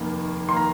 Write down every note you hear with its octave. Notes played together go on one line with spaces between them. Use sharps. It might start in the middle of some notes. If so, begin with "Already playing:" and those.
Already playing: F1 D#2 D#3 A#3
D#3 A#3 C6
A#5